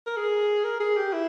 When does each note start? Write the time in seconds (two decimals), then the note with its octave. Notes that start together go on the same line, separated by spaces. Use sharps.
0.07 A#4
0.17 G#4
0.64 A#4
0.80 G#4
0.97 G4
1.13 E4